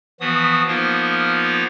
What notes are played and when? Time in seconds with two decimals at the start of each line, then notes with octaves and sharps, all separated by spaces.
0.20 E3 F3 B3 F#4 D#6
0.68 F3 A#3 B3 D#4 F4 A#4